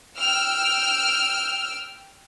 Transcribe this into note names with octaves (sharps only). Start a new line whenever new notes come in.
G5 E6 F6